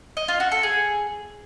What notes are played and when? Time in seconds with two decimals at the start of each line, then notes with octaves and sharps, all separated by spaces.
0.17 D#5
0.28 F4
0.40 F#4
0.52 A4
0.63 G#4